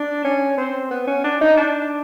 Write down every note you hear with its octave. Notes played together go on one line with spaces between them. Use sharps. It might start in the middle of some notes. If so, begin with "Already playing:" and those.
Already playing: D4
C#4
C4
B3
C#4
D4
D#4
D4